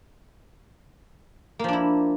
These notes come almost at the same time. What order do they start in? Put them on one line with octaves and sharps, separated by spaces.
A#3 F3 D4 E4